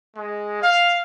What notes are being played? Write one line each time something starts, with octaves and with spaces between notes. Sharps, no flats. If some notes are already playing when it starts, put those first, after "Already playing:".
G#3
F5